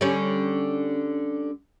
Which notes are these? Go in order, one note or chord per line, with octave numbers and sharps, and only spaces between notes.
D3 G3 C#4